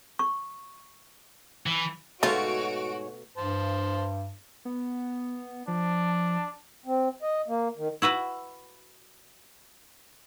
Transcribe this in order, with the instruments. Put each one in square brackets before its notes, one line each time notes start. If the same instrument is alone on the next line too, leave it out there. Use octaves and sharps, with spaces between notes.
[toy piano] C#6
[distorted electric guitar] E3
[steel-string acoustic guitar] G#2 C#5 [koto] B2 A3 F5 [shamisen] F4 [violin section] F#4 D7
[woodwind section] G2 [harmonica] C5 A5
[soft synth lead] B3
[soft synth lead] F3 [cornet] D4
[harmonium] C4
D#5
A#3
D#3
[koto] E4 F#4 B4 E5